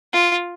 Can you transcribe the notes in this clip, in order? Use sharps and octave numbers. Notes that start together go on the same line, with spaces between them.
F4